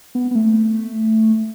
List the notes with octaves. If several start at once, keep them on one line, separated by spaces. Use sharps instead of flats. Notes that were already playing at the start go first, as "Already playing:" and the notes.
B3
B3
A3